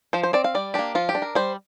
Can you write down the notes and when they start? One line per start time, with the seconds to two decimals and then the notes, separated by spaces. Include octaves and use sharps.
0.13 F3 C5
0.23 C5
0.33 C4 D5
0.44 F5
0.55 G3 D5
0.74 A#3 D4 G4
0.95 F3 F4
1.09 G4
1.15 D4
1.22 A#4
1.35 G3 C5